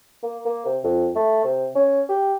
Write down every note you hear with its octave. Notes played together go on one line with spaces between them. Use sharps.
A#3
A#3
C3
F2
A3
C3
C#4
G4